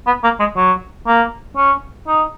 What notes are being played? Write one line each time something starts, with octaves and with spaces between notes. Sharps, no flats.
B3
A#3
G#3
F#3
A#3
C#4
D#4